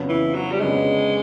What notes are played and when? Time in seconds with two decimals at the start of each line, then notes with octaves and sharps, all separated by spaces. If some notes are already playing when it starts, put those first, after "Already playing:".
Already playing: F2 C#3 F#3 B3 D4
0.09 E3
0.35 F#3
0.52 G3
0.61 F2 C#3 F#3 G#3 B3 D4